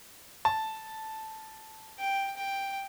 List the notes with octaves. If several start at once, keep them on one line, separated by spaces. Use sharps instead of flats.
A5
G5
G5